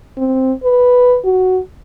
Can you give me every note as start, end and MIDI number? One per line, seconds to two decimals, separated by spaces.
0.18 0.52 60
0.64 1.18 71
1.25 1.60 66